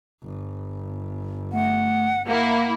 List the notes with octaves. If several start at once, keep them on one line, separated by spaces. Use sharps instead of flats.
G1
A3 F#5
A#3 E4 F5 F#5